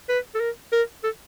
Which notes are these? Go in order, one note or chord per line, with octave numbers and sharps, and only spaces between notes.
B4
A4
A#4
A#4
A4